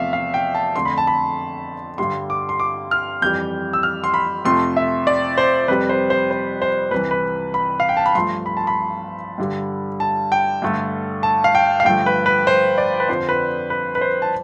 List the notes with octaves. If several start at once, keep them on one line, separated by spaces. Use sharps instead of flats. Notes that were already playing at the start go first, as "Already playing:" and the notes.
Already playing: E2 C3 F3 A3 E5 F5
F5
G5
A5
F2 D3 A3 C6
B5
A5
B5
G2 D3 G3 C6
D6
C6
D6
F6
F2 E3 G3 G6
E6
F6
C6
B5
F2 C3 F3 A3 C6
E5
D5
C5
F2 C3 G3 B4
C5
C5
C5
C5
C2 C3 E3 B4
B4
B5
F5
G5
A5
B5
G2 F3 A3 C6
B5
A5
B5
G2 D3 G3
A5
G5
G2 D3 A3
A5
F5
G5
F5
G2 D3 F3 A3 G5
B4
B4
C5
D5
B4
F2 D3 F3 C5
B4
B4
B4
C5
A5